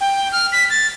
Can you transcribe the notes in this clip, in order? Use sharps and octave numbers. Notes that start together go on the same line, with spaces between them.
G5
F6
B6
A6